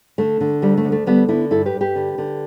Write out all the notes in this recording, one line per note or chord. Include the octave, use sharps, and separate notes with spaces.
D3 A3
D3
D2 G3
A3
D2
A3
D3 G3 B3
D3 B3 E4
G2 E4 A4
G4 B4
G2
G4 B4
D3
D3